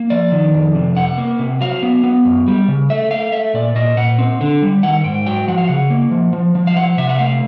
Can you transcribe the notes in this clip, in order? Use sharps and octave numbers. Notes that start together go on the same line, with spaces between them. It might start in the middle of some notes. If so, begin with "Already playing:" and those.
Already playing: A#3
F3 D5
D#3
F2
C3
C3 F#5
A#3
C3
F#3 F5
B3
B3
F#2
G3
C#3
A3 E5
A3 F5
A3 E5
A#2 D5
A#2 D#5
A#2 F#5
C4
D3
G3
D#3 F#5
G#2 G5
F#3 G5
F3 F#5
F5
C#3 F#5
A#3
F3
F3
F3
F5
F3 F#5
C3 E5
F#5
A3 F5